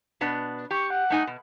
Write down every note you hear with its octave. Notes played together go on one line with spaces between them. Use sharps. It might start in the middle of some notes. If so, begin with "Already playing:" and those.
B2 B3 D4
G4 C#6
F#5
A3 D#4 G#5
B2